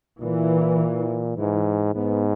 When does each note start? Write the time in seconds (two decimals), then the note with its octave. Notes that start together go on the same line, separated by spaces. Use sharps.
0.21 A#2 E3
1.37 G#2 E3
1.95 G#2 B3